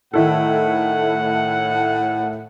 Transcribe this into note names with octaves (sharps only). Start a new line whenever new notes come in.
A2 D#3 E4 A4 F#5